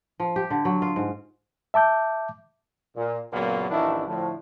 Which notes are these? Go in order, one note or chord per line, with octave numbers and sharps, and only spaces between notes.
F3
G4
D3
F#3
F4
G#2
E5 A5 D6 G6
A#2
F#2 A#2 C#3 F#3 A#3 B3
A1 F2 D#3 A3 D4 E4
A2 D3 F3